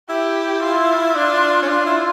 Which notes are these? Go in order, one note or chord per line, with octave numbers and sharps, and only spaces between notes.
E4 G4
F4
D4 F4
C#4
D4 F4
E4